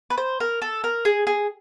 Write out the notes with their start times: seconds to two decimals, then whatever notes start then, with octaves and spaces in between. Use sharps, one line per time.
0.10 B4
0.18 C5
0.40 A#4
0.62 A4
0.84 A#4
1.05 G#4
1.27 G#4